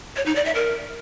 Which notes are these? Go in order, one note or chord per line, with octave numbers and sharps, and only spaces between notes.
C#5
D#4
D5
E5
A#4